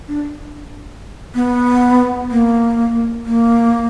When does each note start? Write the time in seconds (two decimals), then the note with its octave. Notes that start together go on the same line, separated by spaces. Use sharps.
0.08 D4
1.35 B3
2.31 A#3
3.26 A#3